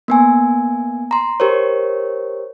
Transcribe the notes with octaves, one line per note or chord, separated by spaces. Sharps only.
A#3 B3 G#5
A#5 C6
G4 A#4 C5 C#5